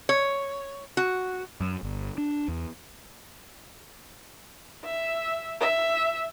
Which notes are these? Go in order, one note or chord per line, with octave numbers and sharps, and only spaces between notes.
C#5
F#4
F#2
G1
D4
E2
E5
E5